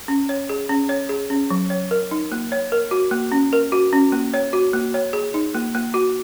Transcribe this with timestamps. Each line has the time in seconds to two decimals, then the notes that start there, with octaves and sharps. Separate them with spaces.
0.08 C#4
0.29 C#5
0.49 G#4
0.69 C#4
0.89 C#5
1.09 G#4
1.30 C#4
1.50 F#3
1.70 C#5
1.91 A#4
2.11 D#4
2.32 A#3
2.52 C#5
2.72 A#4
2.91 F#4
3.11 A#3
3.32 C#4
3.53 A#4
3.72 F#4
3.93 C#4
4.12 A#3
4.34 C#5
4.53 F#4
4.73 A#3
4.94 C#5
5.13 G#4
5.34 D#4
5.55 A#3
5.75 A#3
5.94 F#4